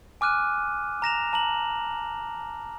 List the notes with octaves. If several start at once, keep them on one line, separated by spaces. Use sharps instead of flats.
G#5 D6 F6 F#6 D#7
A#5 A#6 E7 F7
A5 A#5 F#7